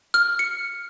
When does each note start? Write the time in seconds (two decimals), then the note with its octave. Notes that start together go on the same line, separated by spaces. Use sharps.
0.14 F6
0.39 C#7